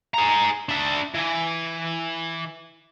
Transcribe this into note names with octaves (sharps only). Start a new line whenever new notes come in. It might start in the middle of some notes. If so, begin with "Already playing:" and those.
G#4 A#5
D4 E5
E3